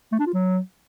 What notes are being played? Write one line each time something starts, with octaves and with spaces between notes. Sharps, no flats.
A3
D4
F4
F#3